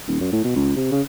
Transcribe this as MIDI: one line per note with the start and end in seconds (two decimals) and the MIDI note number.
0.08 0.19 27
0.21 0.30 42
0.32 0.43 45
0.44 0.53 47
0.56 0.75 37
0.76 0.91 48
0.92 1.02 49